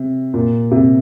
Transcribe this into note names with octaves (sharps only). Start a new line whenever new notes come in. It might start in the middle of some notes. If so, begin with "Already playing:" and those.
Already playing: C3
A#2
C3